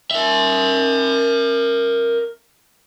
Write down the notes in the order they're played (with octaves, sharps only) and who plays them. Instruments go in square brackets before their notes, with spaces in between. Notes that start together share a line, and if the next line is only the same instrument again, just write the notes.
[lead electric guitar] A#4 E5